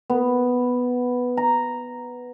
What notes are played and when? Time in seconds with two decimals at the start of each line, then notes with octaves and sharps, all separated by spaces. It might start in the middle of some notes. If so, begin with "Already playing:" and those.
0.10 B3
1.37 A#5